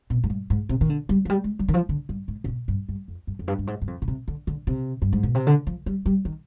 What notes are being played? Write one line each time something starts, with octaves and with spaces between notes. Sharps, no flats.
B2
G#2
G2
G#2
C3
D#3
D3
G3
F3
G3
G#3
G3
D#3
F3
D3
G2
G#2
C3
B2
G2
G2
F2
G2
F2
G2
G2
G#2
G2
F2
B2
C3
D3
D3
C3
G2
G#2
B2
C3
D3
F3
G3
G3
D#3